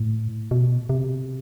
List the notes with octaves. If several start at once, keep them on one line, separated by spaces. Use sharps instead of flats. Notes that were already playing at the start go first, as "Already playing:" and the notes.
Already playing: A2
B2
C3